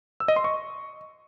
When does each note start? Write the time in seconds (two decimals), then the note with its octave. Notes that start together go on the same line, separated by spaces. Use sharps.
0.20 E6
0.28 D#5
0.36 C6
0.44 C#6